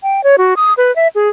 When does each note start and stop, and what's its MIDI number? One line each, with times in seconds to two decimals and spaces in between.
0.03 0.23 79
0.24 0.36 73
0.38 0.54 66
0.57 0.73 87
0.77 0.94 71
0.96 1.08 76
1.15 1.29 68